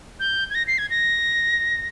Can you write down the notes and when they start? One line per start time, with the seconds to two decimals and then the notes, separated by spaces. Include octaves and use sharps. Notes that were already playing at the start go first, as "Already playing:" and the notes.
0.20 G6
0.50 G#6
0.55 A#6
0.67 C7
0.78 G#6
0.90 A#6